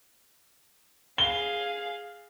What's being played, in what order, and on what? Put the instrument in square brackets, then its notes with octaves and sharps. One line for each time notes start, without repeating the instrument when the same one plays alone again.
[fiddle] G#4 F5 [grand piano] G7